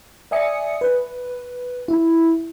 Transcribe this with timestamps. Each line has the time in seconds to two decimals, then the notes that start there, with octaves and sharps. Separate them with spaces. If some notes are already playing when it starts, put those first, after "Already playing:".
0.31 D5 E5 G#5 D#6 C#7
0.81 B4
1.88 E4